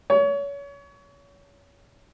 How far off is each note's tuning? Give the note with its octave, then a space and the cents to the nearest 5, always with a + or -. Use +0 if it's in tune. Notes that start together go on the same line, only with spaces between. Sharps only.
C#5 +30